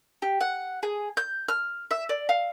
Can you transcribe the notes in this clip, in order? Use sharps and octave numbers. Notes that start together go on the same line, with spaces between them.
G4
F#5
G#4
G6
F6
E5
D5
F5